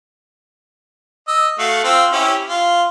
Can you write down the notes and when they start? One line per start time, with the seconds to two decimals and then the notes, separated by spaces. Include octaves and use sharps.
1.28 D#5 E6
1.59 A3 F#4 F5
1.84 C4 F4 E6
2.12 C#4 E4 G4
2.49 F4